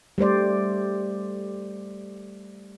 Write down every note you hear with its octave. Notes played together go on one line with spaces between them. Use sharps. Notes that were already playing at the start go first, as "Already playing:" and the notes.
G3 A3 C5 D5